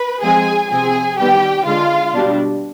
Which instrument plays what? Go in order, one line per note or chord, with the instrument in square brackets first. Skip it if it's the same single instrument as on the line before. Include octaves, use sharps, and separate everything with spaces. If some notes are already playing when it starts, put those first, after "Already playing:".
Already playing: [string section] B4
F3 G#3 C4 G#4 G#5
C3 F3 C4 G#4 G#5
D#3 G3 B3 G4 G5
D3 G#3 D4 F4 F5
B2 G3 D4